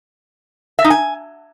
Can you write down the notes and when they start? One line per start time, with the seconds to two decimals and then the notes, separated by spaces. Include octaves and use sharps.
0.79 E5
0.84 D#4
0.90 G#5